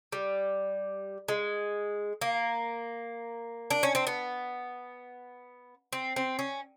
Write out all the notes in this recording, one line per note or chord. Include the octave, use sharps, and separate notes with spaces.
G3
G#3
A#3
D4
C#4
C4
B3
C4
C4
C#4